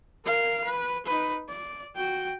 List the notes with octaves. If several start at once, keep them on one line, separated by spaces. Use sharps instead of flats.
A#4 F5
B4
D#4 B4
D5
F#4 G5